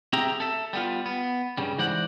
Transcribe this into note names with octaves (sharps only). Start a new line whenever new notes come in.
C4 G4 G#4 E5 G5 A#5
A4 E5
G3 B3 F4
B3
G2 C#3 G3
G#2 E3 C5 D5 F#5